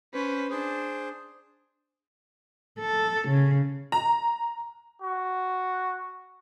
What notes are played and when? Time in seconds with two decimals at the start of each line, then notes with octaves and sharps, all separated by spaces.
0.14 C#4 B4 C5
0.50 D4 G#4 C5
2.80 A4
3.28 C#3
3.92 A#5
5.02 F#4